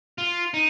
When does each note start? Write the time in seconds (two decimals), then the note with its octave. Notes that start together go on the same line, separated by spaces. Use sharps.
0.18 F4
0.54 D#4